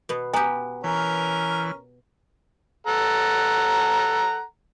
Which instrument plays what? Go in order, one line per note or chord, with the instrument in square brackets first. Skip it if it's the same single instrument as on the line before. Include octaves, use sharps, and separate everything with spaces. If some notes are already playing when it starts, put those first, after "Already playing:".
[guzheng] B2 B3
[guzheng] B3 G4 [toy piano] G#5 A#5
[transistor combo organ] E3 [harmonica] C#4 A#4
[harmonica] A4 F#5 A#5